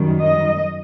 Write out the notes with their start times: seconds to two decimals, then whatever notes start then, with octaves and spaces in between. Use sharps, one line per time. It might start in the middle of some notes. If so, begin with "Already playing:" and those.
Already playing: F#2 D#3 G3
0.22 D#5